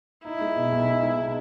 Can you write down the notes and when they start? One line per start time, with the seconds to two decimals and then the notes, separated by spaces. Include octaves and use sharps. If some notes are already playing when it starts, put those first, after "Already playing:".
0.25 D#4 E4
0.41 G#3
0.56 B2
0.72 B1
0.87 D#4
1.03 G#3
1.19 B2